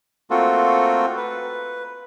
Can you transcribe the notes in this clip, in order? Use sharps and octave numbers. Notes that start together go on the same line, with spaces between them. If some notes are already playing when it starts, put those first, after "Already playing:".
A3 A#3 C4 F4 F#4 A4
B4